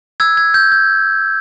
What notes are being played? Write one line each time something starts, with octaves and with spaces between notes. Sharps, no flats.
E6 G#6
G#6
G6
G6